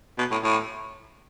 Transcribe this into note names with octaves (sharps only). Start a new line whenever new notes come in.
B2
A2
A2